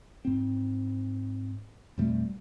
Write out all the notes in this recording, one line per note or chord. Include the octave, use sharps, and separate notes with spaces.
G#2 C4
F2 B2 G3 A3